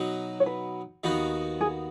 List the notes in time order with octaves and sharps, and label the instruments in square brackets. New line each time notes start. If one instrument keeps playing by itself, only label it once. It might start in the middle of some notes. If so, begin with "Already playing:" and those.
Already playing: [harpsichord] B2 F#3 D#4
[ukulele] C#5
B4
[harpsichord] D#2 D#3 B3 D#4 F#4
[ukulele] G#4